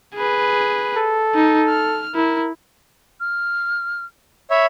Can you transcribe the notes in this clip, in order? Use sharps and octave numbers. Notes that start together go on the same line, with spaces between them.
G#4 B4
A4
D#4
F6
E4 A#4
F6
C#5 E5 B5